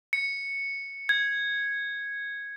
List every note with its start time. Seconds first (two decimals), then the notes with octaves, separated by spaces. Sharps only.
0.13 C#7
1.09 G#6